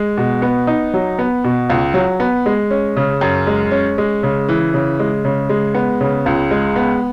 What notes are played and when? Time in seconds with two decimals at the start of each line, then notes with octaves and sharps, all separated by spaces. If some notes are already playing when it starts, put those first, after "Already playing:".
Already playing: G#3
0.17 B2
0.42 B3
0.67 D#4
0.94 F#3
1.19 B3
1.44 B2
1.70 C#2
1.94 F#3
2.20 B3
2.46 G#3
2.71 C#4
2.97 C#3
3.21 F#2
3.47 G#3
3.71 C#4
3.98 G#3
4.23 C#3
4.49 E3
4.74 C#3
5.00 G#3
5.25 C#3
5.49 G#3
5.74 B3
6.01 C#3
6.26 C#2
6.51 G#3
6.76 B3